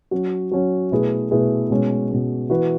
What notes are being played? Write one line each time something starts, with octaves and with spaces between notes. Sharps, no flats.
F#3 C#4 F#4
F#3 C#4 F#4
B2 A3 E4 G#4 B4
B2 A3 E4 G#4 B4
B2 G#3 C#4
B2 G#3 C#4
E3 B3 F#4 B4